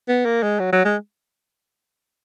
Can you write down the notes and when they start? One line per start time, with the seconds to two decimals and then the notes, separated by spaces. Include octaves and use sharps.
0.08 B3
0.25 A#3
0.43 G#3
0.60 F#3
0.73 F#3
0.85 G#3